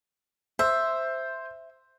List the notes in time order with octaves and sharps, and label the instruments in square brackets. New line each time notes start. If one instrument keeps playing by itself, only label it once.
[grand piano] C5 [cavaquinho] E5